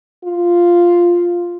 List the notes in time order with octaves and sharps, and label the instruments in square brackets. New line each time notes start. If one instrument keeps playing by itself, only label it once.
[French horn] F4